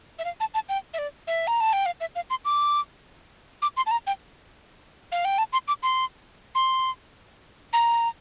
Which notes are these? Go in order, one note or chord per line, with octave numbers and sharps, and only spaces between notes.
E5
F5
A5
A5
G5
E5
D5
E5
A#5
A5
G5
F5
E5
F5
C6
D6
D6
C6
A5
A#5
G5
F5
G5
A5
C6
D6
C6
C6
A#5